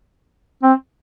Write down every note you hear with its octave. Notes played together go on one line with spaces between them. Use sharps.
C4